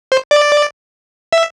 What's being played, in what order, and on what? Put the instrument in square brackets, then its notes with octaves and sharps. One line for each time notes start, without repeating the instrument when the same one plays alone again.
[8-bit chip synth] C5
D5
E5